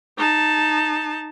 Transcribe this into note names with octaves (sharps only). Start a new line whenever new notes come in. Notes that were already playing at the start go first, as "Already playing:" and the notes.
D#4 A5